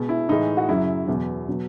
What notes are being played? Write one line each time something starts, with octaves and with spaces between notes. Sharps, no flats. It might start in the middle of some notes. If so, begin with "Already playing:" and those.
Already playing: B2 G#3
E4
A2 E3 G#3 D#4
F#4
F#2 C#3 F#3 E4
E2 B2 F#3
B2 F#3